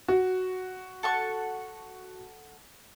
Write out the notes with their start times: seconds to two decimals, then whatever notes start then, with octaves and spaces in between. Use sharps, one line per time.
0.08 F#4
1.03 A4 F#5 C#6